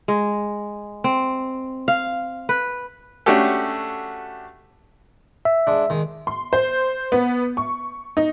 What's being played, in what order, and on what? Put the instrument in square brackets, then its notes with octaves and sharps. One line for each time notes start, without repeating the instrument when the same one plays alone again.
[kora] G#3
C4
F5
B4
[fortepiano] A3 C#4 D4 F#4 G4 A4
[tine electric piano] E5
[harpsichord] G#3 D4
D#3 G#3
[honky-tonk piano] C6
C5
B3
C#6
D#4